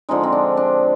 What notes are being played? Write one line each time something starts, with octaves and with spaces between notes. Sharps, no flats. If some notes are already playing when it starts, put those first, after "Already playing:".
D3 F3 G#3 D#4
C4
D4
D4